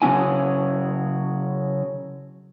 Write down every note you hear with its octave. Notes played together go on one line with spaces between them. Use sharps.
C#3 F#3 C#4 E4 G#5